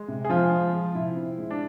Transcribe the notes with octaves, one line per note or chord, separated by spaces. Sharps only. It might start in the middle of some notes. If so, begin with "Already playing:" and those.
Already playing: G#3
C3
G#4
F3 C4 F4
G#3
F3
C3 E4
C4
G#3
D4